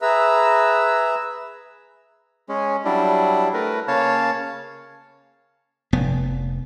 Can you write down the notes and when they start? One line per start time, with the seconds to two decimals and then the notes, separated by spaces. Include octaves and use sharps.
0.02 G#4 B4 E5 A#5 E6
2.49 G#3 C#4
2.85 F#3 G3 D4 E4
3.54 A3 A#4 B4
3.88 C#3 A#3 C#5 F5 A5
5.93 F1 B3